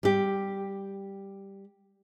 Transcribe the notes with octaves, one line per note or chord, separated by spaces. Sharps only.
G3 G4